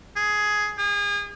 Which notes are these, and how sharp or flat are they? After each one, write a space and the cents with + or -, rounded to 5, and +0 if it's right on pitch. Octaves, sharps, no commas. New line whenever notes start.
G#4 +10
G#4 -35